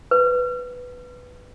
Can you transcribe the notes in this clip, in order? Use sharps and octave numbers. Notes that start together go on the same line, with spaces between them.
B4